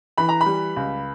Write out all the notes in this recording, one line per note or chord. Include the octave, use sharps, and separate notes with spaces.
E3 B5
A#5
B5
G3
C#2